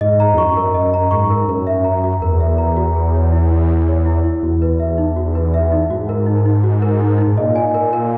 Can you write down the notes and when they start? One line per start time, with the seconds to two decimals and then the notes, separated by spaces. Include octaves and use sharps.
0.01 G#2 D#5
0.20 A#5
0.34 E2
0.38 F#2 C#6
0.57 A#4
0.74 F#2 D#5
0.94 A#5
1.11 G#2 C#6
1.30 A#4
1.48 F#2 A#4
1.67 E5
1.85 A#5
2.04 F#4
2.21 E2 A#4
2.40 E5
2.58 A#5
2.77 F#4
2.95 G#4
3.14 C#5
3.32 E4
3.51 E4
3.70 G#4
3.88 C#5
4.05 E4
4.24 E4
4.43 E2 F#4
4.62 B4
4.80 E5
4.98 D#4
5.16 F#4
5.35 B4
5.54 E5
5.72 D#4
5.89 G#2 F#4
6.09 A#4
6.26 D#4
6.46 D#4
6.63 F#4
6.82 A#4
7.01 D#4
7.18 D#4
7.27 G#2
7.37 A#2 D#5
7.56 G#5
7.74 A#4
7.93 A#4